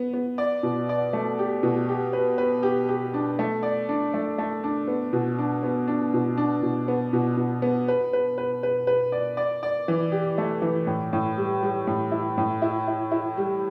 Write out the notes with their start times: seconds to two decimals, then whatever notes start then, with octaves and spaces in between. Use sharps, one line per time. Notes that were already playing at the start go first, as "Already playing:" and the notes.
Already playing: B3
0.14 B3
0.38 D5
0.63 B2
0.89 D5
1.13 A3
1.39 G4
1.63 B2
1.89 G4
2.13 B4
2.38 B4
2.63 G4
2.89 G4
3.14 D4
3.39 A3
3.63 D5
3.89 D4
4.14 A3
4.38 A3
4.64 D4
4.88 B3
5.13 B2
5.38 D4
5.63 B3
5.88 D4
6.14 B2
6.38 D4
6.63 B2
6.88 B3
7.13 B2
7.37 B2
7.62 B3
7.88 B4
8.13 B4
8.38 B4
8.63 B4
8.87 B4
9.12 D5
9.37 D5
9.63 D5
9.88 E3
10.12 G4
10.38 A3
10.62 E3
10.87 A2
11.13 A2
11.38 G3
11.63 G3
11.87 A2
12.12 E4
12.38 A2
12.62 E4
12.88 E4
13.11 E4
13.37 G3